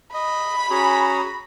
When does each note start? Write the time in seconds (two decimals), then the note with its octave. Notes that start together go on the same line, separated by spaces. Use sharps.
0.14 D#5 B5
0.70 C#4 F#4 G#4 A#5